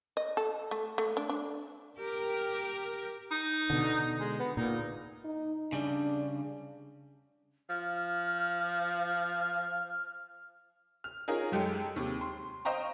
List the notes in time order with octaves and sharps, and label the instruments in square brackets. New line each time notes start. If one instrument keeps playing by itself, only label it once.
[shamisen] D#5
A4
A3
A3
D4
D4
[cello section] G4 A#4
[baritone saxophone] D#4
[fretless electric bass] B2 D3
[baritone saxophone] G#3
B3
[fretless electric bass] A#2 [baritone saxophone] D#4
[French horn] D#4
[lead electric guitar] C#3 G3 [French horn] D4
[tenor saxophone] F3 [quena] F6
[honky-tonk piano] F6
C#4 D#4 F4 G#4 A#4
F#2 G#3 G4 A4 C#7
D#2 C3
C6
C5 D#5 F5 G5 A#5 C#6